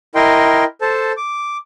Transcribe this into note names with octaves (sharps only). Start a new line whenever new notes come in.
E4 A#4 D#5 G5 C6
A4 C5 A5
D6